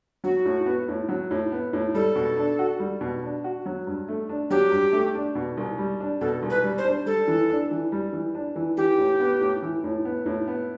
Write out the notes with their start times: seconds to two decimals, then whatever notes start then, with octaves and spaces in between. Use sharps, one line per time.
0.24 F#3 F#4
0.45 A2
0.66 B3
0.88 A2
1.09 F#3
1.31 A2
1.52 B3
1.73 A2
1.94 G3 A4
2.16 B2
2.37 D4
2.59 F#4
2.80 G3
3.01 B2
3.23 D4
3.44 F#4
3.66 F#3
3.87 G2
4.08 A3
4.29 D4
4.50 F#3 G4
4.71 G2
4.93 A3
5.15 D4
5.35 B2
5.57 C2
5.78 G3
6.00 D4
6.21 B2 A4
6.42 C2
6.50 B4
6.64 G3
6.78 C5
6.85 D4
7.06 G3 A4
7.28 E3
7.50 D4
7.71 E3
7.92 G3
8.13 E3
8.35 D4
8.56 E3
8.77 E3 G4
8.98 A2
9.20 B3
9.41 A2
9.62 E3
9.84 A2
10.05 B3
10.26 A2
10.48 B3